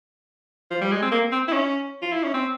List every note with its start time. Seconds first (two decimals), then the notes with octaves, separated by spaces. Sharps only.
0.70 F3
0.81 G3
0.91 G#3
1.02 C4
1.11 A#3
1.32 C4
1.48 E4
1.53 C#4
2.02 F4
2.12 E4
2.23 C#4
2.34 C4